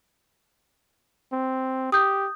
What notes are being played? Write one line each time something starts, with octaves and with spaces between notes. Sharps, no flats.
C4
G4 D#6 G6